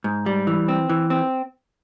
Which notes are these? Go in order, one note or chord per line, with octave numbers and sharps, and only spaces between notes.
G#2
G3
E3
C4
E3
C4